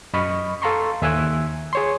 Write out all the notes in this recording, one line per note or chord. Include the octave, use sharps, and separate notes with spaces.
F#2 D#5 B5 C#6 F6
A4 F5 A5 A#5 C6 C#6
D#2 E5 G#5 E6 F#6 G#6
G#4 C#5 C6